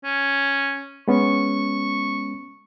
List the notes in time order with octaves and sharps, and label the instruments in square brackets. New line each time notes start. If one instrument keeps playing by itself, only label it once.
[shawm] C#4
[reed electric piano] G#3 B3 C#4 [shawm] C#6